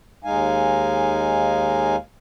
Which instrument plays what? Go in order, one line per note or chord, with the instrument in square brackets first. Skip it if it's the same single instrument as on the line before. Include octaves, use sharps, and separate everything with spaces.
[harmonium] D#2 G#3 D#4 F5 G#5